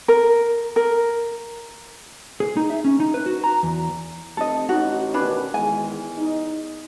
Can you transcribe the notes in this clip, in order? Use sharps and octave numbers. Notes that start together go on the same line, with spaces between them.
A#4
A#4
G#4
D#4
E5
C#4
D#4
B4
F#4
A#5
E2
F1 A4 D#5
A1 D#4 F#4
B2 D#3 C#4 D4 B4 B5
E2 D#3 G#3 G#5
D#4